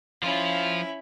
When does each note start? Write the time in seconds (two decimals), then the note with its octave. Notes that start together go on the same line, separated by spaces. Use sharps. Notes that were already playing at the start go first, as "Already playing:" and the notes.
0.23 F3 C#4 E4 F4